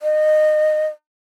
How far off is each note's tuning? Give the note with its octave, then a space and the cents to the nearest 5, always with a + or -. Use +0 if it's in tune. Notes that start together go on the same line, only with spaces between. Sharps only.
D#5 -20